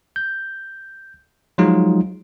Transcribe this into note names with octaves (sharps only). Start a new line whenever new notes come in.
G6
F3 F#3 G#3 D#4 F4